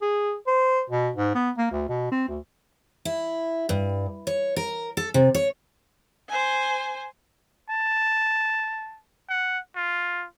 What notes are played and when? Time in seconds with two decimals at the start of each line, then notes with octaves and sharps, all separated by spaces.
0.02 G#4
0.47 C5
0.90 B2
1.16 G#2
1.34 B3
1.58 A#3
1.71 D2
1.89 B2
2.11 C4
2.28 D2
3.05 E4
3.69 G2
4.27 C#5
4.56 A#4
4.97 A4
5.14 C3
5.34 C#5
6.28 C5 G#5
7.70 A5
9.29 F#5
9.76 F4